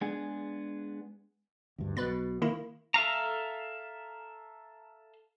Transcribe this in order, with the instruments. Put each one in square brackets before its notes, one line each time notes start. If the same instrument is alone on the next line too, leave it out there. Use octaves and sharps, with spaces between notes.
[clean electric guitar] G#3 B3 D4 G#4
[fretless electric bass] D2 G2
[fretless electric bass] B1 B2 [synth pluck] B4 B5 A6
[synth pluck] D#3 A#3 E4
[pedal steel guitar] A4 E5 F5 A#5